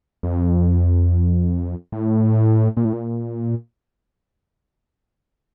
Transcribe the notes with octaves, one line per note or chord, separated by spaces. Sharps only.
F2
A2
A#2
A2
A#2